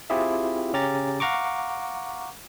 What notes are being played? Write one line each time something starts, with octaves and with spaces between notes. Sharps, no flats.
C4 E4 F4 G4 G#4 E5
C#3 C#4 G4 A#5 A6
F5 F#5 A#5 C#6 D6